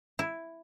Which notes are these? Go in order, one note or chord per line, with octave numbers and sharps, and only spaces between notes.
E4